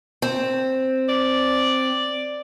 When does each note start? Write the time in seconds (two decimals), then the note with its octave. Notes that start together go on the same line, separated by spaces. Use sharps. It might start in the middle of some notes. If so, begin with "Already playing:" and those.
0.22 C4
1.09 D5